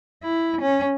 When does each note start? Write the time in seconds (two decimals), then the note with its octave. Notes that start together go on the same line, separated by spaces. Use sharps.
0.23 E4
0.62 C#4